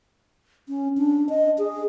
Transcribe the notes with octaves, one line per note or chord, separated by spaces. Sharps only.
C#4
D4
D#5
G#4